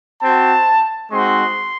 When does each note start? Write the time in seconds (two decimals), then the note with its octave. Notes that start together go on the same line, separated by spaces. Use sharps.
0.22 C4 F#4 A5
1.11 G#3 C4 D#4 F#4 C6